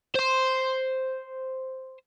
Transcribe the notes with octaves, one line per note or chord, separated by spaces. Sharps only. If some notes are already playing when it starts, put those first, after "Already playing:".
C5 C6